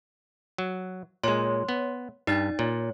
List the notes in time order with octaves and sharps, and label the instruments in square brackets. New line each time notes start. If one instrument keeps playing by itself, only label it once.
[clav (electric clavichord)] F#3
[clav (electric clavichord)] A#2 G#3 [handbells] C#5 C6
[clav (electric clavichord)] B3
[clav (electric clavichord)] G2 [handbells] D#4 D5 A6
[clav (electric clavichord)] A#2 [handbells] C#5